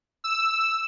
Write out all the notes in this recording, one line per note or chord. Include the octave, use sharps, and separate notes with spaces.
E6